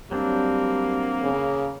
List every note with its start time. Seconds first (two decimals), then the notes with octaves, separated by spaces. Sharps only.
0.11 F#3 G3 A#3 C4 D4
1.22 C#3